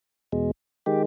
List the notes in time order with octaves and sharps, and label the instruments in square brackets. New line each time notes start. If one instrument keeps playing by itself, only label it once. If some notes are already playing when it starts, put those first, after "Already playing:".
[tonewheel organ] E2 B2 G#3
D#3 G#3 G4